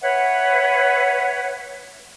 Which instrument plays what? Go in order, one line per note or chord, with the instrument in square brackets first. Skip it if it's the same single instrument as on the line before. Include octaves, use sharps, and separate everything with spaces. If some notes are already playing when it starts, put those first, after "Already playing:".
[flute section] B4 C#5 E5 F#5